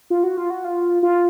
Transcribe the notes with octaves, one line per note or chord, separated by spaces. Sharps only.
F4
F#4
F4
F#4
F4
F4